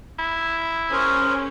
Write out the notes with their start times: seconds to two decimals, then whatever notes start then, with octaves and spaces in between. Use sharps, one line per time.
0.19 E4
0.92 C#4 G#4 A#4 C5